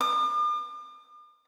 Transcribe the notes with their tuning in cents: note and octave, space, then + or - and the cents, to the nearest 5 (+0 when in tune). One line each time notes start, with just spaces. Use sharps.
D6 +45